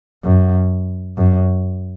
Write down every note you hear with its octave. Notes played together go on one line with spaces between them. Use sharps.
F#2
F#2